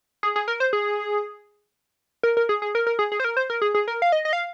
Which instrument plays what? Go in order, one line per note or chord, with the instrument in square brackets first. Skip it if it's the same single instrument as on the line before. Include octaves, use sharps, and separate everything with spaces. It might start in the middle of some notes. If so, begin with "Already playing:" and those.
[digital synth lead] G#4
G#4
A#4
C5
G#4
A#4
A#4
G#4
G#4
A#4
A#4
G#4
G#4
C5
A#4
C5
A#4
G#4
G#4
A#4
F5
D#5
D#5
F5